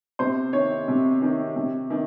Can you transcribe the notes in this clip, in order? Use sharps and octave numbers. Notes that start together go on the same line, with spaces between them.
C3 C5
D#3 C#5
C3
D#3
C3
D#3